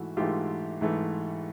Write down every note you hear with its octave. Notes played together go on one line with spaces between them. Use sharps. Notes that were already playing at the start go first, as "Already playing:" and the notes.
Already playing: G#2 E3 A3 E4 F#4
G#2 E3 A3 F4 G4
G#2 E3 A3